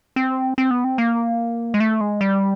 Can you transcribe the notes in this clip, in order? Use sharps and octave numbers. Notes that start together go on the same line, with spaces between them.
C4
C4
B3
C4
A#3
G#3
A3
G#3
G3